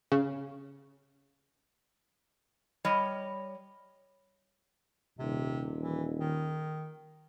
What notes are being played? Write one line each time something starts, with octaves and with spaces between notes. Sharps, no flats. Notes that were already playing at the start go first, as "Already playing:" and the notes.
C#3
G3 C#5 D#5
D#1 C3
E3
D#3